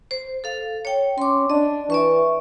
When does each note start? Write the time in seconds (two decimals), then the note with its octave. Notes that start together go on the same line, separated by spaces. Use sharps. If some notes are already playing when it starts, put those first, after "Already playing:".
0.11 C5
0.44 A4 F5
0.85 C#5 G5
1.18 C#4 C6 D6
1.50 D4 D#5
1.90 E3 D5 E5 C#6